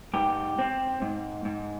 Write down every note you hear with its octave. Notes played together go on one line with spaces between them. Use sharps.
G#2 G4
C4
G#2
G#2